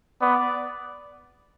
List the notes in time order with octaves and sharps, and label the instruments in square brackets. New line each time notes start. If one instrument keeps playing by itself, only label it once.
[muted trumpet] B3 [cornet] D5